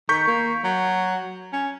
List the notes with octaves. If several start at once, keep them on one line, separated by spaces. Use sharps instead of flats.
D#3 C#6 G6 B6
A#3
F#3
C#4